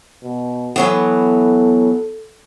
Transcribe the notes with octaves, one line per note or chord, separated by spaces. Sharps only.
B2
E3 F#3 B3 A4